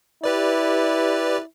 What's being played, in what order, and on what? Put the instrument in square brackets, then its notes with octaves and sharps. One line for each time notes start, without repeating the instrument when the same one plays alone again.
[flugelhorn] E4 [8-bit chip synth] G4 B4 D5